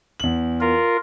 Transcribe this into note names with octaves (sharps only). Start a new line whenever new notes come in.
E2 F#7
F4 A#4